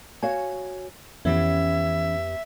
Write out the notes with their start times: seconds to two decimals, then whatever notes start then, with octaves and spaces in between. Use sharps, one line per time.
0.23 F#4 C#5 F5 G#5
1.25 F2 E3 B3 C#4 G4 E5